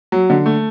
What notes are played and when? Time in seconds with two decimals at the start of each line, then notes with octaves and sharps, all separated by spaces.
0.12 F#3
0.30 D3
0.46 A3